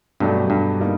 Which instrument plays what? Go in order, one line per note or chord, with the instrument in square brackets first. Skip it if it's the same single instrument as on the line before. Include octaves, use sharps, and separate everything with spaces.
[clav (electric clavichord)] G2 [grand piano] B2 F#3 A3 D4 G4
[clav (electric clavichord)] G2
[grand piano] D3 G3 A#3 D#4